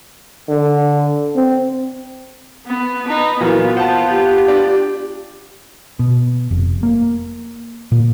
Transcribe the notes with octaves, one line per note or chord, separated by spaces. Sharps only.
D3
C4
B3
D#4 B4
A#2 E3 F#3 B3 F4
C5 F#5 A5
G4
D4
B2
F1
A#3
A#2